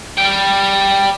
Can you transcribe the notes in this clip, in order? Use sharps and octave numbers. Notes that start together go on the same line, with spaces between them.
G3 G5